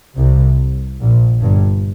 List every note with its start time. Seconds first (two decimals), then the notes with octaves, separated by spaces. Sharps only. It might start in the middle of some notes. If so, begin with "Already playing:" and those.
0.16 C2 C3
1.01 A#1 A#2
1.42 G1 G2